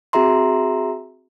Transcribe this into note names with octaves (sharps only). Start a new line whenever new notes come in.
C4 F#4 G#4 E5 A#5 C6